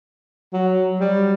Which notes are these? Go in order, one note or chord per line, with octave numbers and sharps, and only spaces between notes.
F#3
G3